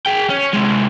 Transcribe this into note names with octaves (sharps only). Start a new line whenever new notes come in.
G#4 G5
C#4
C3 G#3